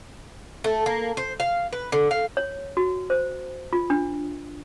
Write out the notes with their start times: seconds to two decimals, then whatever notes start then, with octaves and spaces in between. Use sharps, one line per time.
0.64 A3
0.86 A#3
1.17 C5
1.40 F5
1.73 B4
1.92 D3
2.11 F5
2.37 C#5
2.77 F#4
3.10 C5
3.73 F4
3.90 D4